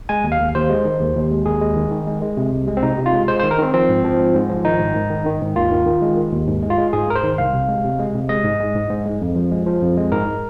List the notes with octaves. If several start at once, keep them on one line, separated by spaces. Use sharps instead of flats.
G#3 G#5
D#2
F5
D#2
D#2 C5
G#3
D#3
D#2
D#2
G#3
D#2 G#4
G#3
D#3
D#3
G#3
G#3
C3
C2
G#3
C4
C3 D#4
C3
F4
G#3
G#3 C5
C5
D#3
A#4
D#3 C4
F3 C4
G#2
F3
G#2
G#2
F3
D#3 D#4
G#2
G#2
D#3
D#3
G#2
D#2 F4
D#3
D#3
G#3
D#3
D#2
G#2
G#3
F4
G#3
G#2 G#4
G#2 A#4
C5
D#3
C2 F5
C3
G#3
C3
G#3
C3
G#3 D#5
G#2
G#3
G#2
G#2
G#3
F2
F3
G#3
F3
F2
G#3
G#2 A#4